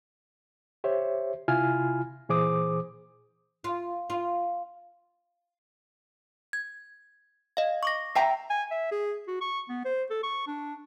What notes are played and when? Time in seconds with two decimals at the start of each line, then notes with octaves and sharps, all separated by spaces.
0.84 G4 C5 C#5 E5
1.48 C3 E4 F4 G#5 F6
2.29 A#2 E3 G#4 C5 D6 D#6
3.64 F4
4.10 F4
6.53 G#6
7.57 D#5 F5
7.83 C#6 D6 A#6
8.15 E5 G5 A#5 C7
8.50 G#5
8.71 E5
8.91 G#4
9.27 F#4
9.41 C#6
9.69 B3
9.85 C5
10.10 A4
10.23 C#6
10.47 D4